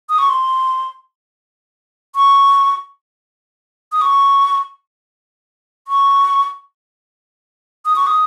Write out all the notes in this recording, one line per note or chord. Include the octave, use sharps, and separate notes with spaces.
D#6
C#6
C6
C#6
D#6
C#6
C#6
D#6
C#6
D#6